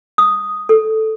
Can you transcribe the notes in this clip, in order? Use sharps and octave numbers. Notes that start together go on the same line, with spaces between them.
D#6
A4